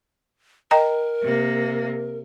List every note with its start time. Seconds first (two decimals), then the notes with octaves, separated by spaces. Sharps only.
0.71 A#4 D#5 G5 A#5
1.22 C3 A#3